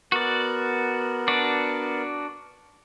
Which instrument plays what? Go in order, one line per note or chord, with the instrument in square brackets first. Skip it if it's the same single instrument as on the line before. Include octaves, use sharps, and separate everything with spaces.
[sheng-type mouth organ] B3 A#4 [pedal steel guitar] F#4 D5
[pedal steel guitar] D4 F#4 D5